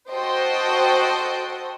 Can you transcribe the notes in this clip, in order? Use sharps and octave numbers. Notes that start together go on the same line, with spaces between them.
F#4 A4 C5 D#5 G5